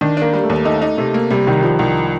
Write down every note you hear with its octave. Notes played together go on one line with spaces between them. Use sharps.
D#3 D4
A#3 D4
G3
A3
D#2
A3 D#4
D#4
C3 A3
A#3
C3 G3
C2 D#3
F3 G3
C2 D#3